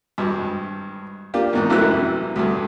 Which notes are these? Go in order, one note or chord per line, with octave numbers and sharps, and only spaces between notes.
G#1 G2
A#3 D4 F4 G4
E2 G#2 D#3
A1 F#2 C3 E3 E4 F#6
D2 G2